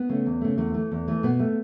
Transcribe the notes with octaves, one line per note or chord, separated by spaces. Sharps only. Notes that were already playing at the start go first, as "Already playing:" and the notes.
Already playing: B3
C#3 A3
E2
C#3 A3
E2 A3
E3 A3
E2
E3 A3
B2 B3
A3